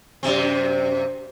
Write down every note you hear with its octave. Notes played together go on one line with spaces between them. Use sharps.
F#2 C3 C4